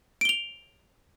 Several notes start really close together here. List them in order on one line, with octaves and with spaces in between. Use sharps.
D7 G7 F7